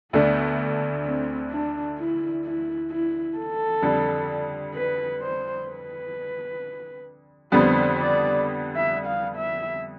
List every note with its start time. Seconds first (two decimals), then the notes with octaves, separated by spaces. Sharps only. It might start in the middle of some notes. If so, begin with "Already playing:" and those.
0.13 D2 D3 A3 B3 D4
1.05 C4
1.51 D4
1.98 E4
2.45 E4
2.90 E4
3.37 A4
3.82 F2 D3 G3
4.74 B4
5.21 C5
5.67 B4
7.52 F2 D3 G3 B3 C5
7.98 D5
8.76 E5
9.06 F5
9.37 E5